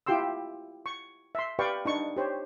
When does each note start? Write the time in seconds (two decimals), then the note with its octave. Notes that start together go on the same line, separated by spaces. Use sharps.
0.06 E4 F4 G4 G5 C6 E6
0.86 C#6
1.35 E5 C6
1.59 G4 B4 D5 F5 G5 C#6
1.85 D4 D#4 C#6
2.17 G4 C5 C#5